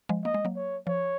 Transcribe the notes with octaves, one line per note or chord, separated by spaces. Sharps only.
F3 G#3
A#3 D#5
G#3
F#3 A#3
C#5
F3 C#5